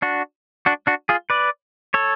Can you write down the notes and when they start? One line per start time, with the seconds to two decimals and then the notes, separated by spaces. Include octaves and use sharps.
0.02 D4 F#4
0.66 D4 F#4
0.87 D4 F#4
1.09 F4 G#4
1.30 B4 D5
1.94 A4 C#5